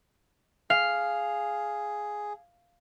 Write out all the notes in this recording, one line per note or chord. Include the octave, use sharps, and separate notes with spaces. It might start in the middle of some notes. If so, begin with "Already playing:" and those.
G#4 F5